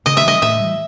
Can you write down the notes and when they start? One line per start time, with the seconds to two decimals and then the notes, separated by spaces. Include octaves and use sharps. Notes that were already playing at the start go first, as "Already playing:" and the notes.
0.06 C#3 D#5
0.17 E5
0.24 E3 G3 D#5
0.42 A2 E5
0.60 E3 G3